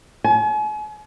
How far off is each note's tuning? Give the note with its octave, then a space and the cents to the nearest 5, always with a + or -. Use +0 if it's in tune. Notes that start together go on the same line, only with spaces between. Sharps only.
G#5 +40